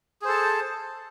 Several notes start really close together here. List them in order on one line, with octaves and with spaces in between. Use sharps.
G#4 C5 A4 A5